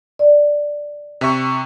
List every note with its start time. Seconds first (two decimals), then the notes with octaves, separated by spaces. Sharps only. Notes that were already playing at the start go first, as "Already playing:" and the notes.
0.19 D5
1.21 C3 E5 C#6